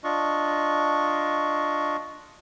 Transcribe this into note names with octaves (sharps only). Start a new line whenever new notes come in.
D4 F4 D#5 C#6